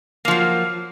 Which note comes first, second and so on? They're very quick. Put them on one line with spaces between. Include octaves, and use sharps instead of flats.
A#3 F3 F#3